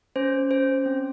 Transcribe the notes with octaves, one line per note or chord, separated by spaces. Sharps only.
C#4 C5
C#4 C5
C4